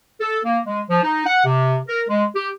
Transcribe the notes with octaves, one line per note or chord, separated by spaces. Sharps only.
A4
A#3
G#3
F3
D#4
F#5
C3
A#4
G#3
G4